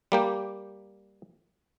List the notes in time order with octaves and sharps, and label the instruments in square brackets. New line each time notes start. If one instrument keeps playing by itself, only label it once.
[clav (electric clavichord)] G3 A#3 G4